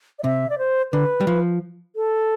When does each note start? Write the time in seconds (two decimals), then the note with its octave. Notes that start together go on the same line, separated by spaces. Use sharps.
0.19 D5
0.24 C3 E5
0.50 D5
0.58 C5
0.92 D3 B4
1.21 G3
1.27 F3
1.96 A4